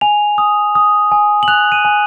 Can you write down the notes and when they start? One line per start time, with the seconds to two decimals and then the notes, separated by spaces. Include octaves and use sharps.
0.01 G#5 F7
0.38 D#6
0.75 D#6
1.12 G#5
1.43 F#7
1.48 F#6 F7
1.72 D#7
1.85 G#5